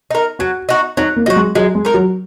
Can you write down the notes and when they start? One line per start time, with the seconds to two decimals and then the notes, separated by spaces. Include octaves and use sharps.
0.11 D#4 A#4
0.39 F#3 F#4
0.69 D#4 F#4
0.97 F#3 D#4
1.16 A#3
1.26 F#3 D#4 F#4
1.36 G#3
1.55 F#3 G#3
1.75 G#3
1.85 D#4 A#4
1.94 F#3